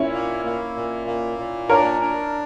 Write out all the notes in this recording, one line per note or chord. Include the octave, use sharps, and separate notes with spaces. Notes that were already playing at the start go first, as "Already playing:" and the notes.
Already playing: A#2 C#4 E4
A#3
A#3
A#2
A#3
A#2
D4 A#4 C#5
D4